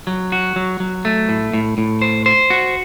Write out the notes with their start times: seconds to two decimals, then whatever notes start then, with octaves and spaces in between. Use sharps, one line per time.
0.07 F#3
0.32 F#4
0.56 F#3
0.80 F#3
1.05 A3
1.29 A2
1.53 A2
1.78 A2
2.02 C5
2.26 C5
2.50 F#4